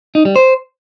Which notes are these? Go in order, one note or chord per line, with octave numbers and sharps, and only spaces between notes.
D#4
G3
C5